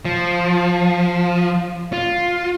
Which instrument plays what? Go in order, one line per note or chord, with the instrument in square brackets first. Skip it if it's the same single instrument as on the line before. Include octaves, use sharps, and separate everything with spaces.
[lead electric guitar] F3
F4